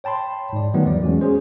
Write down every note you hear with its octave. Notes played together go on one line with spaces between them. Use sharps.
C#5 G5 A5 B5 C6
G#2 D5
D#3 F#3 G3 A3 B3 D#4
E2 E3 D5
G#3 C#4 F#4
C#4 G#4 C5